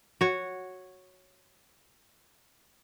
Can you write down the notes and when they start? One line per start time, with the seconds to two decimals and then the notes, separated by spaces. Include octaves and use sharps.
0.21 F#4 C#5